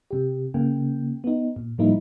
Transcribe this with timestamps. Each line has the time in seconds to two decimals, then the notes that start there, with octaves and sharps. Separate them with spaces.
0.11 C3 G4
0.54 C#3 A#3 G5
1.24 B3 D#4
1.56 A#2
1.78 A2 F3 G3 A#3 D#4 E4